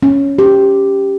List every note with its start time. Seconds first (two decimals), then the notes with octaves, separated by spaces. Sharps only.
0.03 C#4
0.39 G4